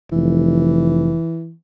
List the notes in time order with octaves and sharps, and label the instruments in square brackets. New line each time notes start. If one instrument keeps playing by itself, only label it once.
[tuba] F1 [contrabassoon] E3